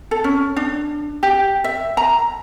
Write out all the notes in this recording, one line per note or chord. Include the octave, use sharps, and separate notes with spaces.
A4
C#4
D4
G4
E5
A#5